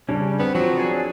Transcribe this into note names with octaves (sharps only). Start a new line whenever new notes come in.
C#3 G3 C#4 D4
B3 C4
F3 F#3
D4 G#4